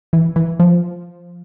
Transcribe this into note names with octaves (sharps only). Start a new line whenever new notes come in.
E3
E3
F3